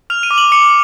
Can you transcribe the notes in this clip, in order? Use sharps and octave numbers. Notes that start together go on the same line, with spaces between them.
F6 F7
D#7
D6
F#7
D6 C#7